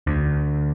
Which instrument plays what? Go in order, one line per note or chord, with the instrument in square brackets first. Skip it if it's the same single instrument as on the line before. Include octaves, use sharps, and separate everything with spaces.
[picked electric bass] D2